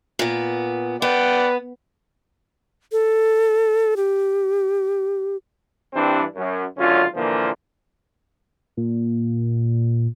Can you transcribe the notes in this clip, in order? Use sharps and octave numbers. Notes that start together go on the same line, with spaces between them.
A#2 B3
B3 B4 D5 F#5 G5
A4
G4
G2 E3 G3 C4 D4
F#2
G#1 F#2 D3 C#4 F4
A#2 D3 E3 F3 A#3
A#2